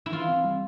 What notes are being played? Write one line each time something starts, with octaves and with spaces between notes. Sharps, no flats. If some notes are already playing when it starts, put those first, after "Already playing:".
E4
E3 F4
C4
G3